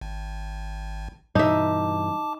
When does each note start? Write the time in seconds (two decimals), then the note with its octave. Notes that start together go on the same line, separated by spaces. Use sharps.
0.01 G#1
1.35 G2 B2 E3 D#4 E5 A5 D6